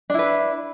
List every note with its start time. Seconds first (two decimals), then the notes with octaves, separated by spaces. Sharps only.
0.10 D4
0.14 E4
0.19 B4